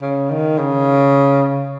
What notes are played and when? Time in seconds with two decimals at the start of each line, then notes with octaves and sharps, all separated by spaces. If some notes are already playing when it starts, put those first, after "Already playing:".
0.02 C#3
0.30 D#3
0.59 C#3